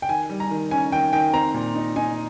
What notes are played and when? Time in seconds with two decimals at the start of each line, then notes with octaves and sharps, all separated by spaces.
0.02 G5
0.09 D#3 G#5
0.29 G3
0.40 A#5
0.51 D#3
0.71 C#4 G#5
0.92 D#3 G5
1.13 D#3 G5
1.33 C4 A#5
1.54 A#2
1.76 D#4
1.96 D#4 G#5